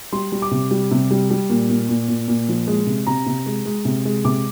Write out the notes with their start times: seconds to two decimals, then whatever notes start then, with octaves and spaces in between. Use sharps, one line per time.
0.12 G3 C6
0.32 G3
0.42 D6
0.51 C3
0.71 G3
0.91 C3
1.11 G3
1.30 G3
1.50 A#2
1.70 A#2
1.89 A#2
2.08 A#2
2.28 A#2
2.48 F3
2.67 G#3
2.87 C3
3.07 C3 A#5
3.26 C3
3.46 G#3
3.65 G#3
3.85 C3
4.05 G#3
4.25 C3 D6